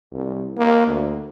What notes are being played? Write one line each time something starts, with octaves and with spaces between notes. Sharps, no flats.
C2
A#3
D2